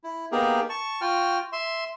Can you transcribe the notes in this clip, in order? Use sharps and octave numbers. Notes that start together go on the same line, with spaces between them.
E4
A#3 B3 D#4 G4 G#4 A#4
A5 C#6
F4 F#4 G5 F6
E5 C6